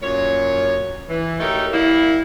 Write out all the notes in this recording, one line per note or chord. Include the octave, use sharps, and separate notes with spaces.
F#2 A#2 C#5
E3
F#3 A3 D#4 G4 A#4
G3 A#3 E4